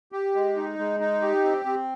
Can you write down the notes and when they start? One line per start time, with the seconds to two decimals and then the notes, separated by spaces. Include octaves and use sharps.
0.12 G4
0.35 G#3
0.56 D#4
0.79 G#3
1.00 D#4
1.22 G4
1.44 C4
1.65 C4